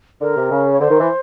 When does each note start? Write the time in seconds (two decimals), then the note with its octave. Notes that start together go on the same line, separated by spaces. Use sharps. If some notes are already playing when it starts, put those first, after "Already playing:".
0.21 D3 A#4
0.36 C3
0.51 C#3
0.73 C#5
0.80 D3 C5
0.90 D#3
1.00 E3